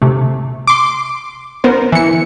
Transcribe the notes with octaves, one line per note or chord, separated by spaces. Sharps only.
C3 A3
C6 D6
B3 A#4 C5
E3 C#7